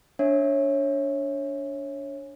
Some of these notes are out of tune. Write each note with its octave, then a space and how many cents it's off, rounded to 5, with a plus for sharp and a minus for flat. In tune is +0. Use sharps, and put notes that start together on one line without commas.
D4 -25 C#5 -15 E5 +0